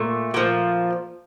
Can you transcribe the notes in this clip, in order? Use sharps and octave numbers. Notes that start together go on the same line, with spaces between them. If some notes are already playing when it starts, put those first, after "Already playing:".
Already playing: A#2 A3
A#2 F3